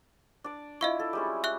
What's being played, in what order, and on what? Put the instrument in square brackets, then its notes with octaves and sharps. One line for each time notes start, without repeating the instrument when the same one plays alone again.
[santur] D4 D5
[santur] E4 F4 [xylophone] D#5 F5 C#6
[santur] A4
G3 G#3 C#4
[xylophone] E5 C#6 F#6